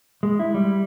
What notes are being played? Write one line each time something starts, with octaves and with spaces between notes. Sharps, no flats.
G#3
E4
G3